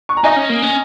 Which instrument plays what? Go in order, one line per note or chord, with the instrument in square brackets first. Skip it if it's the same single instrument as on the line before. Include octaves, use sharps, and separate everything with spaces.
[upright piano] C#6
A#5
[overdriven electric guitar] D#4 [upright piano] D#5 G#5
[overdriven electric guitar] C#4
A#3
C#4